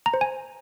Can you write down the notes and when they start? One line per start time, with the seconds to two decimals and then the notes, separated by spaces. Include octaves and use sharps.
0.06 A#5
0.14 C5
0.21 G#5